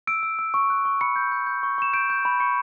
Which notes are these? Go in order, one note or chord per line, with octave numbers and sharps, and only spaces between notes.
E6 D7
E6
E6
C#6
F#6
C#6
B5 C#7
G6
G6
G6
C#6
C#6 E7
G6 D7
G6
B5
C#6 C#7